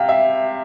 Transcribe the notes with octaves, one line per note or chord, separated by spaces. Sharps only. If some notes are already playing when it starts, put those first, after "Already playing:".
Already playing: C3 F5 G5
E5